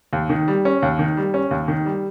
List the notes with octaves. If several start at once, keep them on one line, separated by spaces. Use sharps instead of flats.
D#2
D#3
G3
C#4
D#2
D#3
G3
C#4
D#2
D#3
G3